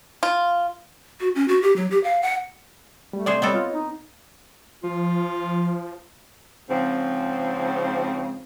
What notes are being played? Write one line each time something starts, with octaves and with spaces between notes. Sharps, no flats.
F4
F#4
C#4
F#4
G4
F#3
G4
F5
F#5
G3 A3
C3 G#4 C5 D5 C6
G3 B3 C4 A4 C#5 D#5
F4
D#4
F3 F4
G#2 C#3 F3 C4